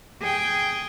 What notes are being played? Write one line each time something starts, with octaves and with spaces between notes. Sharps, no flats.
G#4 G5